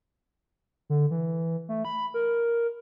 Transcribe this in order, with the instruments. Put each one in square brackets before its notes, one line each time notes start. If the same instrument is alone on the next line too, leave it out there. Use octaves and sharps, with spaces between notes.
[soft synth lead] D3
E3
A3
B5
A#4